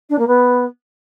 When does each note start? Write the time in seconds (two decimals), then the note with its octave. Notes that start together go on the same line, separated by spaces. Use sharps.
0.09 D4
0.18 A#3
0.27 B3